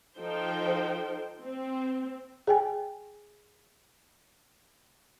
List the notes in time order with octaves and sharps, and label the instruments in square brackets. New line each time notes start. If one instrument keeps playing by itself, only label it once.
[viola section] F3 D#4 A4 C5 G5
C4
[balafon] G#4 G5 G#5